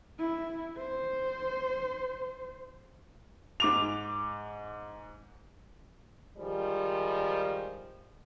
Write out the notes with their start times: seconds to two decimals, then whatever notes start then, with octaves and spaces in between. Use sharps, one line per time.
0.19 E4
0.77 C5
3.60 G#2 D6 F7
6.37 D#3 F3 G3 G#3